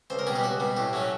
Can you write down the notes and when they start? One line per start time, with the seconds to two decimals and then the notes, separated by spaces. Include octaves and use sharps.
0.10 C#2 C5
0.19 A#4
0.27 B2 G3 G#4
0.36 G4
0.43 C#2 F#4
0.60 B2 G3
0.77 A2 G4
0.93 F#3 A3 C#4